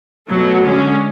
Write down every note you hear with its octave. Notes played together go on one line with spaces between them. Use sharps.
B2 F#3 A3
D3 G#3 C#4